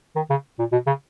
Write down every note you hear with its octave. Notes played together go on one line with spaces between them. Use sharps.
D#3
C#3
A#2
B2
C#3